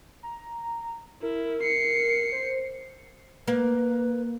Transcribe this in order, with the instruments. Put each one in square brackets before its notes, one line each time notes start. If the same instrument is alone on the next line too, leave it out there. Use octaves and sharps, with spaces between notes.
[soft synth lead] A#5
[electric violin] E4 [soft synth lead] A#4
[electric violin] C7 C#7
[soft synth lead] C5
[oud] A#3 [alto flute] B4